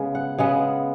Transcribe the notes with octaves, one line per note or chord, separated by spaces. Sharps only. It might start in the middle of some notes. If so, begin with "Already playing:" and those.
Already playing: C#3 G#3 B3
F#5
C#3 G#3 B3 F#5